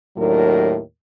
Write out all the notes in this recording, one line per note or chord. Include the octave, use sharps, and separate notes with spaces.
D#2 A2 F#3 D4 A#4